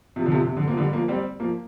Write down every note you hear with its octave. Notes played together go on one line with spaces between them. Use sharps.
C3 F3
D3
C3 F3
C3
D3
F3 A#3
D3 G3
F3 A#3
G3 C4
F3 A#3